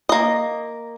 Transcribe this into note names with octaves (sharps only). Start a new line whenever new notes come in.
A#3 D#5